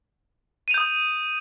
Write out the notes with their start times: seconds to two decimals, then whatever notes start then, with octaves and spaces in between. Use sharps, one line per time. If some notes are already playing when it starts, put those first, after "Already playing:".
0.68 D#7
0.71 F7
0.74 G6
0.78 D#6